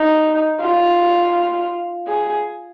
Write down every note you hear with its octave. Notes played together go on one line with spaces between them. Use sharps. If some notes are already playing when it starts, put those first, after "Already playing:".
Already playing: D#4
F4
G#4